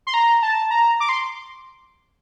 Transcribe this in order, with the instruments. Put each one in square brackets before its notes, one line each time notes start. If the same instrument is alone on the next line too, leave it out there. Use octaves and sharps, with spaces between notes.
[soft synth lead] C6
A#5
A5
A#5
D6
C6